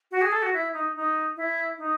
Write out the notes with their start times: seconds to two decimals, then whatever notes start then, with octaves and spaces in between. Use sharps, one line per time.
0.11 F#4
0.22 G#4
0.32 A4
0.42 F#4
0.54 E4
0.74 D#4
0.95 D#4
1.37 E4
1.78 D#4